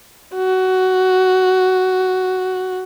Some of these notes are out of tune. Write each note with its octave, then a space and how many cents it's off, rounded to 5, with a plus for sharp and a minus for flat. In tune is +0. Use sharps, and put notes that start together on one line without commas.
F#4 +10